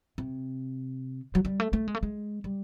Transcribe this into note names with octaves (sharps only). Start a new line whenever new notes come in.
C3
F#3
G3
A3
A3
G#3
A3
G#3
G3